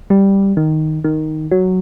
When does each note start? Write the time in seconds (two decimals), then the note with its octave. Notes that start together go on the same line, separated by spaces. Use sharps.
0.10 G3
0.57 D#3
1.04 D#3
1.51 F#3